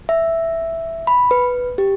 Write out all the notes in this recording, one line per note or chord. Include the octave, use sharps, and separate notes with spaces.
E5
B5
B4
G4